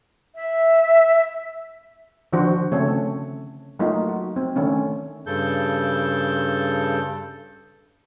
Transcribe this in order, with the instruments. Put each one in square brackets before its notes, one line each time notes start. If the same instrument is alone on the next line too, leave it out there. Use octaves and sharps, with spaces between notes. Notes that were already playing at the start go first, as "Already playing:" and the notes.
[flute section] E5
[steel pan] D3 D#3 F3 D4 F#4 C5
C#3 A3 C4 C#4 A4 C#5
F#3 A3 A#3 D#4 F4 F#4
F#4
C4
D#3 A3 C#4 D4
[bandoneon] G2 C#3 A4 G6